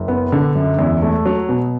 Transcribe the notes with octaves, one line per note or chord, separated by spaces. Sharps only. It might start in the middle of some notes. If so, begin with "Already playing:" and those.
Already playing: F#1
B3
D3
F#2
E2
A3
F#3
B2